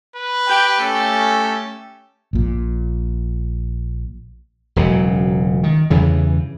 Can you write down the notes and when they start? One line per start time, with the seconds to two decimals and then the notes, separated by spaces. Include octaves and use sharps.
0.16 B4
0.49 G4 G5
0.80 A3 C#4 A4
2.33 A#1 A#2
4.76 E1 C#2 C#3 F#3
5.64 D#3
5.90 E2 G2 C#3 E3